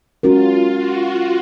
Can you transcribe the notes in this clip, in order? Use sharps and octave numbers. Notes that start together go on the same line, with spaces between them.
G#3 C#4 F4 F#4 A#4
F#4